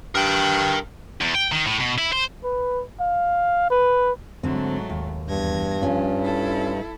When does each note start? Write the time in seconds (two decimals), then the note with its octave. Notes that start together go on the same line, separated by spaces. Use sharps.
0.15 G2 A#4 G5
1.21 E2
1.35 G5
1.52 D#3
1.67 A2
1.80 B2
1.98 E4
2.13 C5
2.44 B4
3.00 F5
3.71 B4
4.43 G#2 D3 F#3 A3 C4
4.90 D#2
5.28 E2 G2 G#6 A#6
5.82 F3 C#4 F4
6.21 E4 A4